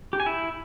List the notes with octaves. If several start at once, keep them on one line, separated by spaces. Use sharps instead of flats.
G4
G#5
E4